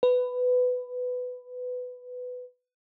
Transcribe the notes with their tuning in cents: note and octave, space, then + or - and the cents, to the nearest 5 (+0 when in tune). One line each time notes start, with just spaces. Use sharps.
B4 +15